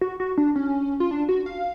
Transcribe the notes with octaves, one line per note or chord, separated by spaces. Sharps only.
F#4
F#4
D4
C#4
F4
D4
F#4
F5